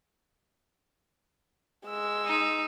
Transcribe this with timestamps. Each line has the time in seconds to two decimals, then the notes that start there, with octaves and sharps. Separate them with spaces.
1.86 G#3 E6
2.26 D#4